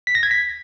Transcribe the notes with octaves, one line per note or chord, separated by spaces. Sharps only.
B6
A#6
G#6
B6